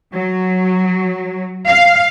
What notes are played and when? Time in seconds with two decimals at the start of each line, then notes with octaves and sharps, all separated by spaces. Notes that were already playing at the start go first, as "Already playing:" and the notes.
0.15 F#3
1.66 F5